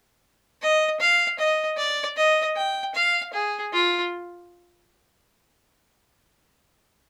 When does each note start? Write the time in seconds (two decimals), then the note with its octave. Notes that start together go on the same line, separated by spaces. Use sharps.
0.62 D#5
1.00 F5
1.39 D#5
1.78 D5
2.17 D#5
2.56 G5
2.95 F5
3.34 G#4
3.73 F4